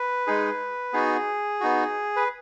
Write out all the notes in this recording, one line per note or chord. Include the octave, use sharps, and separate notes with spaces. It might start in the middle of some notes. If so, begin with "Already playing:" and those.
Already playing: B4
G#3 D#4 G#4
B3 D#4 F#4 G#4
B3 D#4 F#4
B4